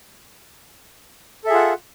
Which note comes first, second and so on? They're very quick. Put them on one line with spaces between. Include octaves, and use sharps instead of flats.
A4 E5 G#4 F4 F#5